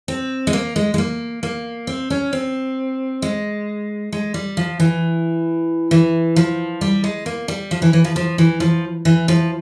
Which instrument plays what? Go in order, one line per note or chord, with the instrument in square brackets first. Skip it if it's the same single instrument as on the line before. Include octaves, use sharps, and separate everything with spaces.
[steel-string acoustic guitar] C4
G#3
A#3
G#3
G#3
A#3
A#3
C4
C#4
C4
G#3
G#3
G3
F3
E3
E3
F3
G3
G#3
A#3
G3
F3
E3
E3
F3
F3
E3
F3
E3
F3